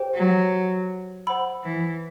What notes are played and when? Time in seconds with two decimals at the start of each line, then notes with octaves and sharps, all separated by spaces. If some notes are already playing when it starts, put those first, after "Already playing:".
Already playing: G4 C5 G5
0.15 F#3
1.27 C5 F#5 B5 E6
1.64 E3